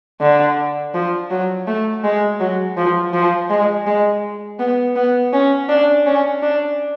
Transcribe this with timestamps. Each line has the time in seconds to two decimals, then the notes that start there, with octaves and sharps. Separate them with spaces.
0.21 D3
0.94 F3
1.30 F#3
1.67 A3
2.04 G#3
2.40 F#3
2.77 F3
3.13 F3
3.50 G#3
3.86 G#3
4.59 B3
4.96 B3
5.33 C#4
5.69 D4
6.06 C#4
6.42 D4